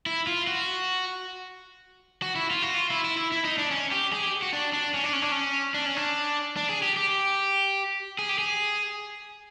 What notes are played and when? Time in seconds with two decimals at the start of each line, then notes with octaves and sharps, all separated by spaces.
0.06 E4
0.27 F4
0.47 F#4
2.22 F#4
2.36 E4
2.51 F4
2.62 F#4
2.74 F4
2.90 E4
3.04 E4
3.17 E4
3.32 E4
3.45 D#4
3.58 D4
3.71 C#4
3.92 G4
4.12 G#4
4.23 G4
4.42 F#4
4.53 D4
4.73 D4
4.94 C#4
5.04 D4
5.13 C#4
5.22 D4
5.32 C#4
5.74 D4
5.86 C#4
5.97 D4
6.57 D4
6.69 G#4
6.82 G4
6.97 G4
8.19 G#4
8.29 G4
8.39 G#4